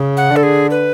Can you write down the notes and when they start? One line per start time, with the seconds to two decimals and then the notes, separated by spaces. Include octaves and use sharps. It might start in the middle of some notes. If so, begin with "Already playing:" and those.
Already playing: C#3
0.17 F#5
0.31 D3
0.36 A4
0.43 G#4
0.71 B4